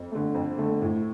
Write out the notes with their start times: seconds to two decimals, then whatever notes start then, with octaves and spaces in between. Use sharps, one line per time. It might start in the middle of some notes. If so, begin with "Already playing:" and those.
Already playing: F2
0.11 D3 A3
0.34 F2
0.58 D3 A3
0.81 A2